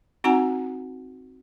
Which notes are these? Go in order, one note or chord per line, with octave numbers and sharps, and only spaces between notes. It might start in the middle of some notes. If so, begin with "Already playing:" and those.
C4 D#4 F#4 F#5 G#5 A#5